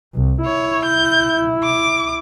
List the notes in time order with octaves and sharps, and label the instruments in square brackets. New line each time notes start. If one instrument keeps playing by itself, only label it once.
[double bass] C2
[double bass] E4 [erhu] C#5
[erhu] G6
D6